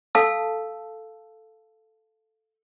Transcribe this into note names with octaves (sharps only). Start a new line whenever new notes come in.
A4 F5 A5 E6